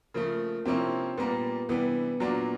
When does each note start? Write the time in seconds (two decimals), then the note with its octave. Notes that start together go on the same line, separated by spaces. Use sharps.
0.14 C#3 F3 A3 A#3
0.66 C3 F3 A#3 C4 C#4 E4
1.17 A#2 G3 A#3 B3
1.69 C3 E3 G3 B3
2.20 A#2 F#3 A#3 D4